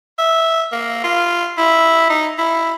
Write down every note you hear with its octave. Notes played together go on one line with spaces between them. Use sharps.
E5
A#3
F4
E4
D#4
E4